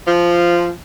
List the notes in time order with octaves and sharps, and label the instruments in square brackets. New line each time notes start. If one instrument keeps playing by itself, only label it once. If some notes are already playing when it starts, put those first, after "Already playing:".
[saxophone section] F3